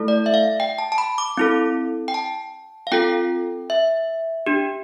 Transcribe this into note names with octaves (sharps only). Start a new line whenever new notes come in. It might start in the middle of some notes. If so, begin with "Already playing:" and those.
Already playing: A3 E4 A4
D5
E5
F5
G5
A5
A5
B5
D6
C4 E4 A4
G5
A5
F5
C4 F4 A4 G5
E5
D4 G4